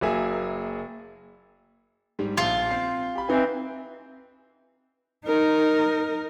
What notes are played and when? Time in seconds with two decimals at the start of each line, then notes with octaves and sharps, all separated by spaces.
0.01 F#1 F#3 A#3 G#4 E5 G#5
2.19 G#2 G3
2.37 A#1 A#2 F4
2.71 C4 C7
3.15 G4 B5
3.28 E3 C4 D#4 G#5
5.26 D#4 A#4